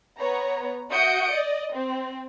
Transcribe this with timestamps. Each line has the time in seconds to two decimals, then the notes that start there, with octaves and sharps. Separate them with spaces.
0.19 B3 C#5 A#5
0.91 F#4 E5 D#6 G6 C#7 D7
1.32 D5 D#5
1.74 C4